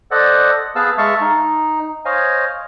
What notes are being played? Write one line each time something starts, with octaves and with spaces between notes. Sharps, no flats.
A4 C5 D5 D#5 F#5
B3 G#4 B4 F5 A5 E6
G#3 E5 F5 A5 C#6
D#4
C5 C#5 D#5 F5 G#5